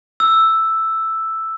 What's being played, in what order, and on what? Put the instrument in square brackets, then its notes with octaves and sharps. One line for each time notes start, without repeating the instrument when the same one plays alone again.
[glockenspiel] E6